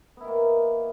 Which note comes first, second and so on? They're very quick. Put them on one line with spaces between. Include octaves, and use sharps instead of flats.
B3 E4 D#3 A#3